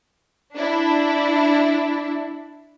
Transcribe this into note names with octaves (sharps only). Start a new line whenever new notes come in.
D4 E4